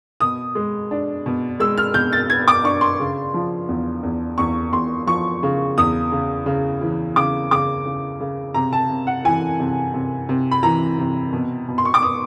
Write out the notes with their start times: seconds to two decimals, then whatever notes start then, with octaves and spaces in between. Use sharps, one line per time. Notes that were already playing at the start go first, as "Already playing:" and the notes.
0.20 B2 D#6
0.55 G#3
0.91 D4
1.26 B2
1.60 G#3 E6
1.77 F6
1.94 B2 G6
2.13 A6
2.30 B3 G#6
2.48 D6
2.64 D4 C#6
2.81 C6
3.00 C#3
3.34 F3
3.69 E2
4.03 E2
4.38 E2 C#6
4.72 E2 C6
5.07 F3 C#6
5.43 C#3
5.78 E2 D#6
6.12 C#3
6.46 C#3
6.81 E3
7.16 C#3 D6
7.51 C#3 D6
7.85 C#3
8.20 C#3
8.54 C3 A#5
8.73 A5
8.90 C3
9.07 F#5
9.25 E3 G#5
9.60 C3
9.94 C3
10.29 C3
10.51 B5
10.63 E3 A#5
10.99 C3
11.33 B2
11.68 B2
11.78 C6
11.85 C#6
11.94 D6
12.02 B3 D#6